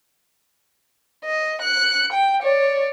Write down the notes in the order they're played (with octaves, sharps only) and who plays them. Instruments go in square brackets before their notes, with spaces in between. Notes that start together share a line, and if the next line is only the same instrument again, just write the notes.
[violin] D#5
F#6 C#7
G5
C#5 D5